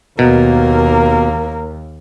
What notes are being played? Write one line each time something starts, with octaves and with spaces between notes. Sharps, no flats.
D#2 B2 A#3 A#4